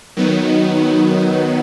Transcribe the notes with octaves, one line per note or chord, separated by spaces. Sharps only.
D#3 F#3 B3